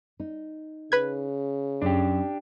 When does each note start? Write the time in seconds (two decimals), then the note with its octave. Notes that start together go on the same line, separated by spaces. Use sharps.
0.20 D#4
0.92 C#3 B4 G#6
1.82 F#2 F#3 D4 G4